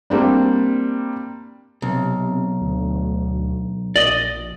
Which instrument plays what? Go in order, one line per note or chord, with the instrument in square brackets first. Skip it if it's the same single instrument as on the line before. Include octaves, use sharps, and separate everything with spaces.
[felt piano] G3 A#3 C4 D4
[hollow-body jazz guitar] B1 [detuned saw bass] C3
[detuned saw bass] D2
[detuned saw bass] A#1 [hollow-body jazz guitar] D5 D#5